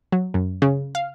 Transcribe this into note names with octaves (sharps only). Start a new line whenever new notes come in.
F#3
F#2
C#3
F5